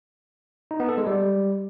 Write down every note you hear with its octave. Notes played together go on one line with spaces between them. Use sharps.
D#4
B3
A4
G#3
G3